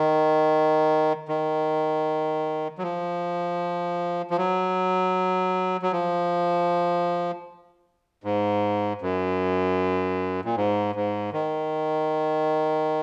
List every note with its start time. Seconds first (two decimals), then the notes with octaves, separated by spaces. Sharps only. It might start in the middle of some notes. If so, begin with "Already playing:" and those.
Already playing: D#3
1.29 D#3
2.78 F#3
2.83 F3
4.31 F3
4.38 F#3
5.82 F#3
5.92 F3
8.24 G#2
9.01 F#2
10.45 A#2
10.57 G#2
10.95 G#2
11.33 D#3